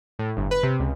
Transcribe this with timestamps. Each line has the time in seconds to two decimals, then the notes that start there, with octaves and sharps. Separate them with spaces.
0.19 A2
0.37 G1
0.51 B4
0.63 C3
0.79 C#2